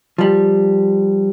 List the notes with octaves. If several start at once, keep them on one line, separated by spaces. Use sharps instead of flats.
F3 G3